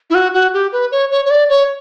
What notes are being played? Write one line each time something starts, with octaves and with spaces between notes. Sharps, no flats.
E4
F#4
F#4
G4
B4
C#5
C#5
C#5
D5
C#5